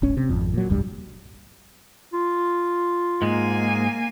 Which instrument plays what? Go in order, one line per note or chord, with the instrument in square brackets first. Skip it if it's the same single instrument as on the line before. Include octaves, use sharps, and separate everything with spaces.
[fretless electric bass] D1 G#1 C#4
C3
G#1 F2
A#2 F#3
F1 C2 G2 G3
[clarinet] F4
[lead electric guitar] G#2 G#3 [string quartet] A#3 G#5